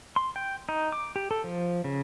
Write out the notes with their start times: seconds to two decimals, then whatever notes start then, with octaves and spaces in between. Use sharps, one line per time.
0.16 C6
0.36 G5
0.69 D#4
0.92 D6
1.16 G4
1.31 A4
1.44 F3
1.84 C#3